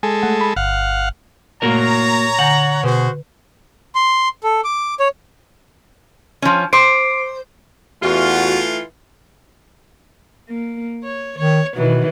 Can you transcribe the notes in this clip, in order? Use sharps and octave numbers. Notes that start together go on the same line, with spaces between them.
G#3 A4 G#5
A3 F#5
B5
G1 F5 F#5
A#2 A3 A#3 F#4 A#4 C#5 A#5
D3 F#5 G#5 G6
B2 F#4 G#4 B4 C5
C6
A4
D6
C#5
F3 C#4
C5 D6 C7 D7
E2 E3 A3 F4 F#4
A#3
C#5
D#3 C#5
B2 D#3 E3 F#3